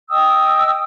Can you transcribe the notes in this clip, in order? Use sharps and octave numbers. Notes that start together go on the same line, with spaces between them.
D#5 G5 D#6 E6